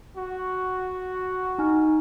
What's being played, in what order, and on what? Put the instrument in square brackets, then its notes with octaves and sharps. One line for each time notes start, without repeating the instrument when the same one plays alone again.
[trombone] F#4
[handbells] D#4 G#5 F6